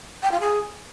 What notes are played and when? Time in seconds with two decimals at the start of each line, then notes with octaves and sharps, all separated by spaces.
0.23 G5
0.32 F4
0.40 G#4